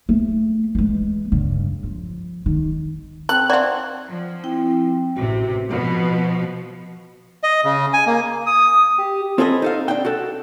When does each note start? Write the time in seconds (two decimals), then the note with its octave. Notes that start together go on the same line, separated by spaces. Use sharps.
0.09 A3
0.75 E3 G#3
1.32 G2 C#3
1.83 F3
2.46 D#3
3.29 C4 A4 F#6
3.50 F3 F#4 D5 E5
4.08 F3
4.44 C4 E4 G5
5.17 A1 C3 F#4
5.70 B2 F3
7.43 D#5
7.65 C#3
7.93 G#5
8.07 A#3
8.46 D#6
8.98 G4
9.38 C4 F4 G#4 A4 B4 D#5
9.62 D#4 A4 F5
9.88 D4 G5
10.05 F#4 A4